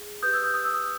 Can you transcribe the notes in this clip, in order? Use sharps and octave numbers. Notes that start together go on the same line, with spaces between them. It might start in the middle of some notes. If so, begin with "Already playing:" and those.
Already playing: G#4
G4 B4 D#6 G6
E6 G#6
D#6 G6
D#6 G6
E6
D#6